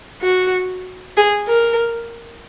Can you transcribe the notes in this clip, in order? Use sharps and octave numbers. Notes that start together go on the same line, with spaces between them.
F#4
G#4
A#4